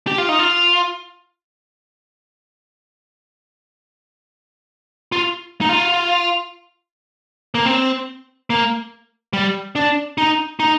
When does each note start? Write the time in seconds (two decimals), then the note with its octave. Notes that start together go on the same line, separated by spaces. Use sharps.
0.07 G4
0.18 F4
0.29 D#4
0.39 F4
5.12 F4
5.61 D#4
5.69 F4
7.55 A#3
7.65 C4
8.50 A#3
9.33 G3
9.75 D4
10.18 D#4
10.60 D#4